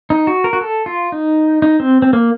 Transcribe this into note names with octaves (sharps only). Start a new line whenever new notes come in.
D#4
F#4
A#4
F#4
A4
F4
D#4
D#4
C4
C4
A#3